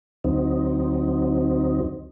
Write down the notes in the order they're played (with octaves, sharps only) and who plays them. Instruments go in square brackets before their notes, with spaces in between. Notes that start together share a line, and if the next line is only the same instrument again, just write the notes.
[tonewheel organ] D2 F#3 C4 D#4